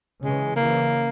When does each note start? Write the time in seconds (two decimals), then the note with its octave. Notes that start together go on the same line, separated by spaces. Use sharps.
0.23 C#3 E3 G#3
0.56 C#3 E3 A#3